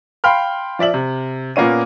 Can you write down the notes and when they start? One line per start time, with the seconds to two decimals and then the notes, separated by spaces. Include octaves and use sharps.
0.24 F5 G5 B5 C6 F6
0.79 F3 D5 E5 F#7
0.94 C3
1.56 A#2 A#3 B3 C#4 D#7